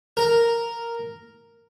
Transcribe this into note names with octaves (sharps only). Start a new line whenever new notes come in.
A#4